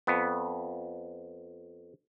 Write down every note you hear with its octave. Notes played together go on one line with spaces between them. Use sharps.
F2 B3